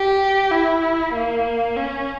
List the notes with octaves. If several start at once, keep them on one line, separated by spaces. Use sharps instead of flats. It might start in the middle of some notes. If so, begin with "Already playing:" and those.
Already playing: G4
E4
A#3
C#4